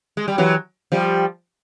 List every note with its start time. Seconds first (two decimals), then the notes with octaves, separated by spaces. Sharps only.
0.17 G#3
0.28 G3
0.38 E3 F#3
0.92 F3 G3